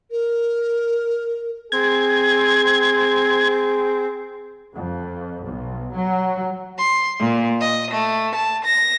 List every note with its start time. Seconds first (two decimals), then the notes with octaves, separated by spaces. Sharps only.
0.11 A#4
1.72 C4 G#4 G#6
4.74 F2
5.43 B1
5.94 F#3
6.76 C6
7.20 A#2
7.60 D#5
7.90 A3
8.34 A5
8.65 A#6